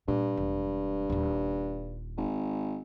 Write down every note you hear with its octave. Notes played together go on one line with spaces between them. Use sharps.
G2 A#2
E1
D#1 F4
G#1